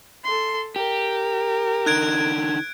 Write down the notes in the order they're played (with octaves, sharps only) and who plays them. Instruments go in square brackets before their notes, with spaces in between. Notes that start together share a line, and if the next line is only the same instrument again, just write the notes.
[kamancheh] A4 C6
[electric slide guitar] G4 [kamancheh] A#4
[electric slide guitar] D3 D#4 [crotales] F#6 G#6 D7